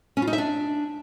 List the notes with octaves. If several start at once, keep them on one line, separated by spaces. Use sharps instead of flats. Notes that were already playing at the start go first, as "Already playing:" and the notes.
C#4
F4
D#4
E5
D4